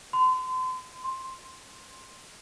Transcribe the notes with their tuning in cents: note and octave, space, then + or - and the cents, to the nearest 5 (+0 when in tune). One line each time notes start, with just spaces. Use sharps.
C6 -35
C6 +10